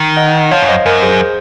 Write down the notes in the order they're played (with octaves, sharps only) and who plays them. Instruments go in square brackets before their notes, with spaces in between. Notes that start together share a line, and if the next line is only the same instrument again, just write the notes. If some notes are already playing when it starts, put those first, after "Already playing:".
Already playing: [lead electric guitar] D#3
[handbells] D#5 F#5
[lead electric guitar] F3 [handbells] C#5 F5
[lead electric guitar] F#2
[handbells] C5 D#5
[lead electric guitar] F#2 [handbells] A#4
[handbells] G#4 C5